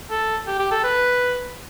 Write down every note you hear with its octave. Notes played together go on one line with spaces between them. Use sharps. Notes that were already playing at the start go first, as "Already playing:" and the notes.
A4
G4
G4
A4
B4